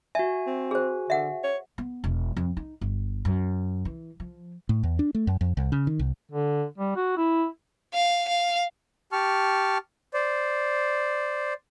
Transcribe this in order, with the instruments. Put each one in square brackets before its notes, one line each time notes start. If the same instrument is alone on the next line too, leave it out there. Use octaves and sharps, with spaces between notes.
[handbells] F#4 G#5 [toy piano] E5
[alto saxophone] C4
[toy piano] G#4 C5
[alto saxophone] D3 [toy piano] E5 F#5
[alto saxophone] C#5
[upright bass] B3
E1
F2
D#4
G1
F#2
E3
F3
[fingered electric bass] A2
E2
D4
A3
F#2
F2
C2
C#3
D#3
C2
[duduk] D3
G3
F#4
E4
[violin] F5
F5
[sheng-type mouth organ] G4 A5 C#6 F6
C5 D5